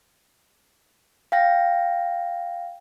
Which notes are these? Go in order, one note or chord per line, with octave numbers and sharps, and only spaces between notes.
F5 G5 A#6